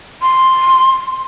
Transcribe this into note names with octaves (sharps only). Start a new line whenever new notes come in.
C6